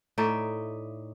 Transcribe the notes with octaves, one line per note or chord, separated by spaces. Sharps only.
A2 D#4 D5 E5